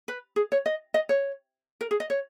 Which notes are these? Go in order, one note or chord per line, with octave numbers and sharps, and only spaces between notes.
B4
G#4
C#5
D#5
D#5
C#5
A#4
G#4
D#5
C#5